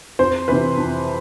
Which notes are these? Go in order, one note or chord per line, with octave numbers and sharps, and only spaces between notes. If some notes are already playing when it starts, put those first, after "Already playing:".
F2 C5
C3 E3 B4
F2